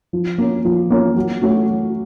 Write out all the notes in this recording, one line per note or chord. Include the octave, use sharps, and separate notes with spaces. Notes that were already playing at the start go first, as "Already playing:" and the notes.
F3
A#3 C#4
F3
A#3 C#4
F#3
A3 C#4 F#4
F#3